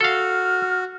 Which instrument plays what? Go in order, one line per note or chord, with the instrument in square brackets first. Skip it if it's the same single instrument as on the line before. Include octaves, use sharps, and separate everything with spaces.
[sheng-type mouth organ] F#4 [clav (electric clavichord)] A4 F5 [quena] F6